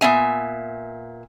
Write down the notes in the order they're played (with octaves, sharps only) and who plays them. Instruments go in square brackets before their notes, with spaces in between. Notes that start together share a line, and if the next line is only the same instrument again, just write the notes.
[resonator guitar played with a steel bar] A#2 B3 E5 G#5